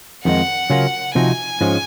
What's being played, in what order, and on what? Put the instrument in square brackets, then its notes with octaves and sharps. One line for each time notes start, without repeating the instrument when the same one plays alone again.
[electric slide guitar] F2 D#3 G#3 D#4 [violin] F#5
[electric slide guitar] C#3 F#3 C#4 F4 A#4
[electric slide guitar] C3 F3 C4 D#4 F#4 [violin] G#5
[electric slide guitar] G#2 F3 G#3 C#4